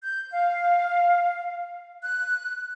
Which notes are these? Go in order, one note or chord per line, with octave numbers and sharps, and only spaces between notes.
G6
F5
F#6